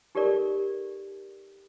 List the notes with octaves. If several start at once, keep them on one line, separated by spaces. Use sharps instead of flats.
D#4 G4 A4 A#4 D5